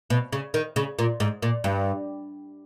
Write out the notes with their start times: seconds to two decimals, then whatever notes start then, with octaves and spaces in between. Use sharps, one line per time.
0.10 B2
0.33 C#3
0.54 D#3
0.76 C#3
0.99 A#2
1.20 G#2
1.42 A#2
1.64 G2